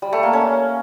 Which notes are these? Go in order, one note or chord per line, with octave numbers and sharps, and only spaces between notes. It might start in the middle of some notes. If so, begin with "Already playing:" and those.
G3
A3
A#3
C#4